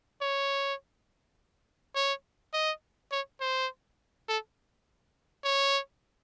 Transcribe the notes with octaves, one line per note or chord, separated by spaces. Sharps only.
C#5
C#5
D#5
C#5
C5
A4
C#5